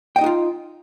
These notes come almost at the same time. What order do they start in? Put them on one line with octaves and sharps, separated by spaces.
G5 D#5 D#4 F#4 F4